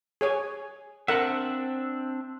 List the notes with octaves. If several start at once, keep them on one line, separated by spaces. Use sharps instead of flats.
G#4 C#5 G#5
C4 D4 A#4 E5 F#5